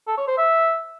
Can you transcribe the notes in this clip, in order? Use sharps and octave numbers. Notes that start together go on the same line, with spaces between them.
A4
C#5
C5
E5